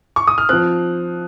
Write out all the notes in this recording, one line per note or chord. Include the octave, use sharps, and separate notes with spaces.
C#6
D#6
F6
F3 C4 F#6